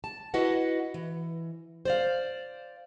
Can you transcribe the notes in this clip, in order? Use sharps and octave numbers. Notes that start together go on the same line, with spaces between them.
A5
E4 F#4 B4 D#5 F#5
E3
C5 D5 F5